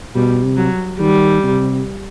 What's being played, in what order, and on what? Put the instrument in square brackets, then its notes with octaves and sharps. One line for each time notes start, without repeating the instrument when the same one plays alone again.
[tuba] B2 [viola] G3
[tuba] C3
[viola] F#3
[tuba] D#3 [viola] G3
[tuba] C3